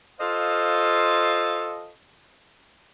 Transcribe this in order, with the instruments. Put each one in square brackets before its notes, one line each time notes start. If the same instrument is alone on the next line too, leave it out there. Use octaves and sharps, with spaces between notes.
[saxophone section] F4 A4 C5 D#5 F5